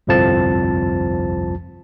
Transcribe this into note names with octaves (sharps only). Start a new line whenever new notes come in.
G1 C2 F2 F3 C4 A5